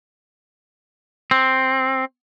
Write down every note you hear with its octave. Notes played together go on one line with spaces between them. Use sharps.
C4